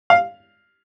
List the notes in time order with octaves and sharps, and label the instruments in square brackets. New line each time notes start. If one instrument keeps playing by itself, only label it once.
[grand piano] F5